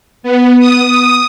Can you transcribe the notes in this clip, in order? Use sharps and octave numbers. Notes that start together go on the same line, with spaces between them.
B3
D#6